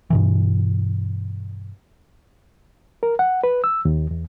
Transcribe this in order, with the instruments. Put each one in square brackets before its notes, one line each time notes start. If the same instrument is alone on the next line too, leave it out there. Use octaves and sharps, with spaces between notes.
[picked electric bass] G2 B2 E3
[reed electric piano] A#4
F#5
B4
E6
D#2
E2